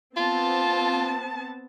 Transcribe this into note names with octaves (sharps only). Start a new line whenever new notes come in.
B3 C4 F4 A5